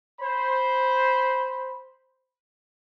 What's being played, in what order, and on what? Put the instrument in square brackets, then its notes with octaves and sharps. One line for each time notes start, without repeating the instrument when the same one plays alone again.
[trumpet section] C5 B5